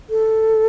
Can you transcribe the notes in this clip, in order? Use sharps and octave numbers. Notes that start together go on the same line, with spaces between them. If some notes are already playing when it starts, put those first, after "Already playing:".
A4